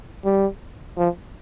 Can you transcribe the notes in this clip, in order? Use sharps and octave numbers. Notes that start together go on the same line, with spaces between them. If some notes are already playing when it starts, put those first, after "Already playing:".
G3
F3